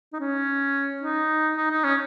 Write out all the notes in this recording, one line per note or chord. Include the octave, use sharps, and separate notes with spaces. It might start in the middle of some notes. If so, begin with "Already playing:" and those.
D#4
C#4
D#4
D#4
D#4
C#4